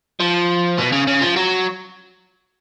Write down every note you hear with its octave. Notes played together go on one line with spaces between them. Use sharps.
F3
B2
C#3
C#3
F3
F#3